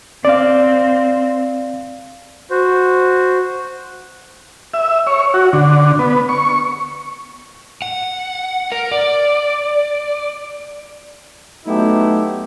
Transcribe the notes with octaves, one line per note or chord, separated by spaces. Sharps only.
C4 D5 F5
F#4 C5
E5
C#5
F#4
D3
B3
C#6
F#5
A#4
D5
F#3 A3 B3 D#4 E4 G4